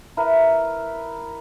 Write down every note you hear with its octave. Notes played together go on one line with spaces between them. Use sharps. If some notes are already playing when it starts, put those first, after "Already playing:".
E4 A#4 B4 E5